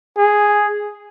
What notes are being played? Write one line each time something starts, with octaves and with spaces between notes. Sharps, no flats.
G#4